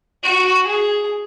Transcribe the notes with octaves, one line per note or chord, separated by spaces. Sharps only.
F#4
G#4